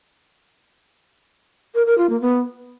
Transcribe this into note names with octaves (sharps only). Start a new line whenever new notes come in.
A#4
A#4
F4
A#3
B3